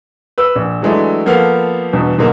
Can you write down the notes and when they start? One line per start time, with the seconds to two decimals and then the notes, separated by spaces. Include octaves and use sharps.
0.38 B4 E6
0.56 A#1
0.82 E3 F#3 G#3 A3 D4
1.26 F3 A#3 B3 A4 F5
1.93 E2 G2 B2
2.18 G#2 B2 D3 F#3 A#3